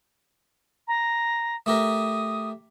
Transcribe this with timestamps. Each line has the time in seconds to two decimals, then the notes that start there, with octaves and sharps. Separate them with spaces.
0.88 A#5
1.66 A3 G4 A#4 D#6